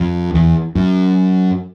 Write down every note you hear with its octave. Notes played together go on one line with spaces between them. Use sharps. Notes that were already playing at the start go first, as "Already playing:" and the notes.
Already playing: F2
E2
F#2